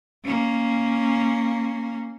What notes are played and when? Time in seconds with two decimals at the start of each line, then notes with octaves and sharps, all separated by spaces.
0.25 A#3 C#4